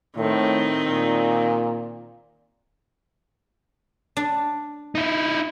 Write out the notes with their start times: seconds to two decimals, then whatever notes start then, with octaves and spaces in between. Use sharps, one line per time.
0.17 A2 D#3 C4
0.86 A#2
4.17 D4
4.95 D#4 E4